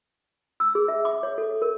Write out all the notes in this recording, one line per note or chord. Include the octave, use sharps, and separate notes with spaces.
E6
G#4
E5
D6
C#5
A4
A#4